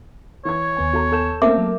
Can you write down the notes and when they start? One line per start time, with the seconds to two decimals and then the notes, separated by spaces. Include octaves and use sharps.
0.45 E3 C#5 G#6
0.77 D#2 B3 G#5
0.93 F#4 A4 A#5
1.12 A4 G6 E7
1.42 A3 A#3 C4 C#4 A4 A#4 E5 D6
1.57 F#3